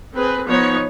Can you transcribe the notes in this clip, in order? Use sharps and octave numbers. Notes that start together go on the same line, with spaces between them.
C4 G#4 B4
F3 B3 D#4 C#5